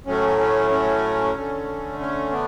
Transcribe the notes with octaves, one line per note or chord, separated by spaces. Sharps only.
A2 F#3 A3 C#4
C#4
C#4
D3 A3
C#4
B3 D4